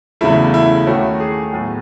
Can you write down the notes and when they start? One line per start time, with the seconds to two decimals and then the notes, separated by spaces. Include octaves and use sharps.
0.21 E2 C#3 F#3 A3 E4
0.54 E4
0.87 D#2 D#3 A3 C#4 F#4
1.20 G#4
1.53 A2 F#3 B3